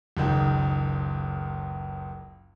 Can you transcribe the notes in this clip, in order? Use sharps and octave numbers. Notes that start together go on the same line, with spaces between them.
F#1 C#2 D#3